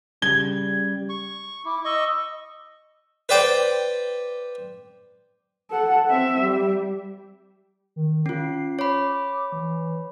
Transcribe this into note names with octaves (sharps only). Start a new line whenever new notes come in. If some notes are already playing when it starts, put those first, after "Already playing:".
C#3 G3 G#6 G7
C#6
E4 D6
D#5 C#6 E6
B4 C5 D5 G5
A4 F#5
C4 E5
G3
D#3
C#4 F4 C7
C#5 B5 D6
E3